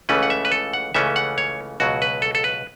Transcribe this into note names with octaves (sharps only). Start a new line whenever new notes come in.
C#2 C#3 E3 A3 C#4 B4
F#5
E5
B4
A4
F#5
C#2 C#3 E3 A3 C#4 E5
F#5
C#5
C#2 B2 F#3 F#4
B4
A4
A4
B4